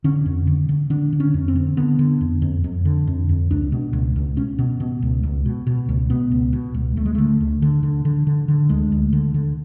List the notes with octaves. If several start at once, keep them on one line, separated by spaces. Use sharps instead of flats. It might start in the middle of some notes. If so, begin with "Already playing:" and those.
D3 C#4
F2
D3
D3
D3 D4
D3
C#4
F2
C4
D3
D3 B3
D3
F2
F2
F2
D3
F2
F2
C#2 D4
B2
C#2
C#2
B2 C#4
B2
B2
C#2
C#2
B2
B2
C#2
B2 B3
C#2
B2
C#2
D2 A3
G#3
D3 A3
D2
D3
D3
D3
D3
D3
D2 G#3
D2
D3
D3